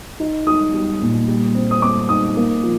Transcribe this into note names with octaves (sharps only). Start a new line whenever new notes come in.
D#4
D#4 D#6
G3
A#2
G3
C4
D#6
C4 D6
D#4 D#6
A#3
F3